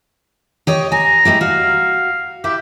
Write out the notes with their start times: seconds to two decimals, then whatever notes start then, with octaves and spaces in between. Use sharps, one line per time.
0.67 G4 C#5 D#5
0.92 G#5 A#5
1.25 G#3 E4 G4
1.41 F#4 F5
2.44 E4 G4 E5